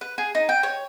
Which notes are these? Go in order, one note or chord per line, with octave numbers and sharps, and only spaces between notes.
B4
G#4
D#4
G5
C#5